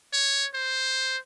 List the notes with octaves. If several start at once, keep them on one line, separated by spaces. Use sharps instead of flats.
C#5
C5